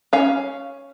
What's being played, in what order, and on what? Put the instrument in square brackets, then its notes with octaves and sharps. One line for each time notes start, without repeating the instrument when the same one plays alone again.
[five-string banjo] C#4 F5